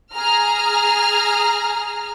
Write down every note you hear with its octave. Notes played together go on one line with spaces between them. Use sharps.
G#4 A#5 F6